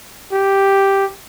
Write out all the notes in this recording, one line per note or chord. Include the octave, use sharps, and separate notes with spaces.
G4